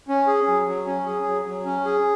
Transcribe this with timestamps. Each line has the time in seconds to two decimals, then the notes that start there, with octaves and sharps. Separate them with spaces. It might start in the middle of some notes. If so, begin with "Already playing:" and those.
0.08 C#4
0.27 G#4
0.48 F#3
0.67 F#3
0.86 C#4
1.06 G#4
1.26 F#3
1.45 F#3
1.65 C#4
1.85 G#4